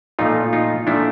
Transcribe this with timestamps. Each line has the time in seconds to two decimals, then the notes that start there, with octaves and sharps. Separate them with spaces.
0.19 A#2 F3 A3 D#4 F4
0.53 D#4 F4
0.87 A#2 F3 A3 D4 E4